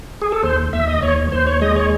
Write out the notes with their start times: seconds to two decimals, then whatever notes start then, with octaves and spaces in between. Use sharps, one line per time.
0.22 G#4
0.32 A4
0.43 D#2 C5
0.73 D#2 E5
0.87 D#5
1.02 D#2 C#5
1.32 D#2 C5
1.47 C#5
1.61 G#3 D#5
1.76 C#5